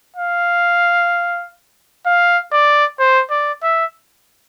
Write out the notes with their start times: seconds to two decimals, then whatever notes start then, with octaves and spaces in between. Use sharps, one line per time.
0.17 F5
2.06 F5
2.53 D5
3.00 C5
3.31 D5
3.63 E5